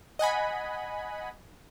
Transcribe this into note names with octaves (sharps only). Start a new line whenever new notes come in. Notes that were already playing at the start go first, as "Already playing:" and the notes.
D#5 F#5 G#5 B5